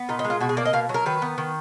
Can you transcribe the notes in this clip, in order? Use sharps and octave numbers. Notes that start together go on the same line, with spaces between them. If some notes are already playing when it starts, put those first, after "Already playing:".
Already playing: B3
A#2 D#4
D#4
G#3
F4
B2 F#4
G#4
A#3 D5
D#5
B2 F5
F#3
A#4
D#3 B4
B3
D#3